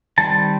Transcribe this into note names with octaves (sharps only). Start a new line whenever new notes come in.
D#3 G3 C4 A5